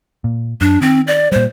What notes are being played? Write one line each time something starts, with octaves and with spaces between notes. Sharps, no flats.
A#2
F#2 D4
D#3 C4
D5
A#2 G3 C5